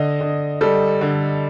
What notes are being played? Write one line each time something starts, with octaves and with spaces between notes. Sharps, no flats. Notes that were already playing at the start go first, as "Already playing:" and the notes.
Already playing: D3 D#5
D3
G3 A4
D3